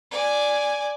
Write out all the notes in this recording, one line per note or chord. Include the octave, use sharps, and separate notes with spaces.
D5 G#5